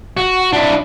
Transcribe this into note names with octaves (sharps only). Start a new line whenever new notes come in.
F#4
D4 E4